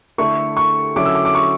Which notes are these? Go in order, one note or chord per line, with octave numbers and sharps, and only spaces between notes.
D3 A3 E4 C#6
C#6
D3 F#3 C#4 E4 D6
E6
D6
D6
C#6